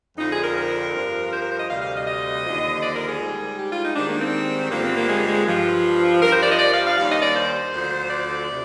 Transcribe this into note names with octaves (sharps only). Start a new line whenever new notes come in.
F2 D3 F3 D#4
G#4
A#4
A#4
G2 F3
C5
A#4
C5
D#5
D2 C3 G3 F5
F5
D#5
D#5
D#2 D3 F3
D5
A#4
G#4
G#2 G3
G4
F4
D#4
G#2 D#3 G3 D4
A#3
C4
G2 D3 F3 A#3
C4
A#3
G#3
G#3
G2 F3
G2 F3 A#4
C5
D5
D#5
D5
F5
F5
D#2 D#3 G3 F5
D#5
D5
C5
D2 D3 F3
D5
C3